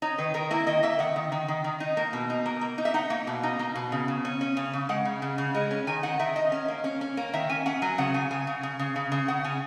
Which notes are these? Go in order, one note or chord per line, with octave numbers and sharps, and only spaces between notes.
D#4 C#5
D#3 B4
D#3 A#4
A#3 E4
D#3 D#5
A#3 E5
D#3 F#5
D#3
D#3
D#3
D#3
D#4
A#3
B2
D#4
A#3
A#3
D#4
E5
D#4 F#5
A#3
B2
D#4
A#3
B2
C#3
C#3
C#4
C#4
C#3
C#3
G#3 F#5
C#3
C#3
C#3
G#3
C#4
D#3 G#5
D#3 F#5
D#3 E5
D#3 D#5
C#4
A#3
C#4
C#4
A#3
D#3 E5
C#4 G#5
C#4 F#5
F#3 G#5
C#3 F#5
C#3 G#5
C#3 G#5
C#3
C#3
C#3
C#3
C#3
C#3 F#5
C#3 G#5